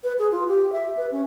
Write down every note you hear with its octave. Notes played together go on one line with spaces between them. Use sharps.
B4
G#4
F4
G4
E5
B4
C#4